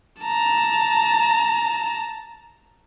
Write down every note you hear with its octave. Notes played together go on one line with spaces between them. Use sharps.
A5 A#5